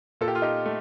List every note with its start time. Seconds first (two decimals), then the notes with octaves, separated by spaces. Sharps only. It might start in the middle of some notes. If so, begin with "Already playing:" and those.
0.21 A#2 A4
0.28 G4
0.35 F4
0.42 D#4 G4
0.65 A3